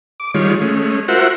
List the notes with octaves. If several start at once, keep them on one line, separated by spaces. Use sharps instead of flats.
D6
D#3 G3 G#3 F4 C#5
G#3 A3 C#4
F4 F#4 A#4 C5 E5 F#5